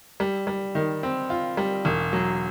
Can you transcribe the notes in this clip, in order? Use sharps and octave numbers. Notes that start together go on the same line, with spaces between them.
G3
G3
D#3
C4
F4
G3
E1
F#3